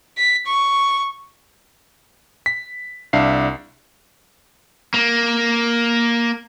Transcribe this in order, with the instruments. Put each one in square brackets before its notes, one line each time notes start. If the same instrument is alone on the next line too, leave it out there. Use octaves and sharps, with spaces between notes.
[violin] B6
C#6
[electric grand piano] B6
C2 D4 E5 F5 C7
[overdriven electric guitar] A#3